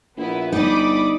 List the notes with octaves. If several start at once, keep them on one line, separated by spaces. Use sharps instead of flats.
A#1 B3 E4 B4
G1 D#4 D5 B5 D6 D#6